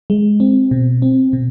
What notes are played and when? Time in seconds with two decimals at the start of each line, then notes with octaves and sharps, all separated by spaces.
0.10 G#3
0.40 C4
0.71 B2
1.02 C4
1.33 B2